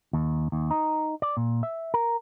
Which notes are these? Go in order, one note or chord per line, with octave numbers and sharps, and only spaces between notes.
D#2
D#2
D#4
D5
A#2
E5
A#4